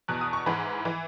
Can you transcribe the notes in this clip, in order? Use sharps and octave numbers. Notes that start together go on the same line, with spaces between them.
E2 B2 F#6
D#6
C#6
G#2 E3 B5
E3